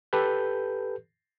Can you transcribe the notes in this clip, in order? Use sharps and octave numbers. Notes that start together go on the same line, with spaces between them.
G4 A4 B4 G6